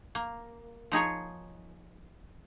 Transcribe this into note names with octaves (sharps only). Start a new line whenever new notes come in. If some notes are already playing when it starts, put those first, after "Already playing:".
A#3
F3 D#4 G#4 C#5